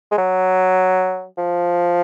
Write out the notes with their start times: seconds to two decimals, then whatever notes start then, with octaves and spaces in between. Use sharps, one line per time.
0.11 G#3
0.18 F#3
1.38 F3